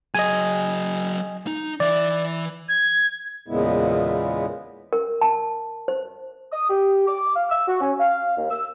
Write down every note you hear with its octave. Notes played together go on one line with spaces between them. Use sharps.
F#3 G#4 D#5 G#5
D#4
E3 D5 E5
G#6
E2 A#2 C#3 G#3 B3 E4
A#4
A5
C5
D#6
G4
D6
F5
E6
F#4
C#4
F5
D#2
E6